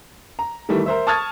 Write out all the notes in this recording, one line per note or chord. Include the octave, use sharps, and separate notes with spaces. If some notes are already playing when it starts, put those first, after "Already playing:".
A#5
D#3 E3 G3 A3
A#4 C5 E5
A5 C#6 D#6 F6 G#6 A6